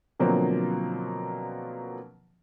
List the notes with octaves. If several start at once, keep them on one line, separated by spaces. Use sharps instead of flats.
B2 D3 F3 F#3 A#3 C4